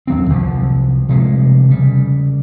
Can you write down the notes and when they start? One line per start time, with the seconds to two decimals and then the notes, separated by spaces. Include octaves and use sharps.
0.07 D#2 F#3 C4
0.30 C2 F3
1.09 C3 F3 G3 G#3
1.69 C#3 G3